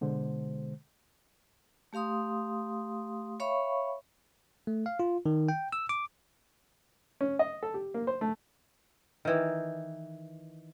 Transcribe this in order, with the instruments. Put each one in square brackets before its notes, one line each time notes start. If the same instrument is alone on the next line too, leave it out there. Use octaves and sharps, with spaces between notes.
[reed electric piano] B2 D3 G#3 C5
[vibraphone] A3 G4 F5 C6 D#6
C#5 E5 F5 B5 C#6
[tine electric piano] A3
F5
F4
D#3
G5
E6
D6
[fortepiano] C#4
D#5
A4
G4
A#3
C5
A3
[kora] D#3 E3